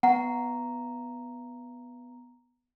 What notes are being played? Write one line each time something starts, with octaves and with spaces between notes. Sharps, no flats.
B3 F#5 A#5